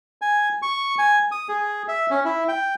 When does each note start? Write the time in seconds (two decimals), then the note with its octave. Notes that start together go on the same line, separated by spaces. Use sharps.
0.22 G#5
0.62 C#6
0.98 G#5
1.31 D#6
1.48 G#4
1.88 E5
2.11 C#4
2.25 E4
2.48 G5